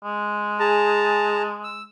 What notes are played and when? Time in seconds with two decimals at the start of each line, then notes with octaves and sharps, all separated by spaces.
0.04 G#3
0.60 G#4 A5 A#5
1.64 E6